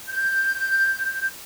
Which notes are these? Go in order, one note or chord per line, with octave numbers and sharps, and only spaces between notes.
G6